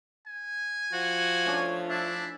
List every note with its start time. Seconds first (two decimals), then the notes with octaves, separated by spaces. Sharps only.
0.27 G#5
0.93 F3 F#4
1.45 A3 C#4 D4
1.90 D4 E4 E5